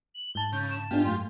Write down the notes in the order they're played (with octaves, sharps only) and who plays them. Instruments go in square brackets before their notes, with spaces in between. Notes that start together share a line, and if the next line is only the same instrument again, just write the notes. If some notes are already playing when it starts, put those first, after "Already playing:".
[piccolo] F#7
[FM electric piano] G#2 A5 [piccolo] G7
[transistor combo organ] C#3 [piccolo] G6
[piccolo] E7
[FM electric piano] G#2 G#5 [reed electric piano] B3 D4 D#4 [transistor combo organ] F4 G4
[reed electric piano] F#2 A3 [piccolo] C6